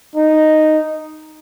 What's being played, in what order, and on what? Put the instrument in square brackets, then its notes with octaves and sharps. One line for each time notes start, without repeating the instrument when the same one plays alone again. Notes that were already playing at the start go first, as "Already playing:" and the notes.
[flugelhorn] D#4